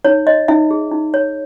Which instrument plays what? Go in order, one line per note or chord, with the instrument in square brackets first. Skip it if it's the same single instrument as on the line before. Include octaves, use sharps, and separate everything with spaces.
[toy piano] D#4 C#5
C#5 D#5
D#4 E5
G#4
D#4
C#5